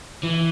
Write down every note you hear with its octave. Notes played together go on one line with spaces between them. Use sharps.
E3